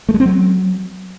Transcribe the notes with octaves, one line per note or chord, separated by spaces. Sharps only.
A3
G#3
C4
F#3